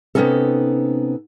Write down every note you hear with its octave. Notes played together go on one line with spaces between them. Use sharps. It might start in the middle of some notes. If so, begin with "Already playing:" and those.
C3 F#3 B3 C#4 D#4 A4